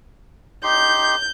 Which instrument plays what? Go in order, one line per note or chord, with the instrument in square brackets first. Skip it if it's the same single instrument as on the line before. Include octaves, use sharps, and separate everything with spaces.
[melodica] D#4 G4 C6 [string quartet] G6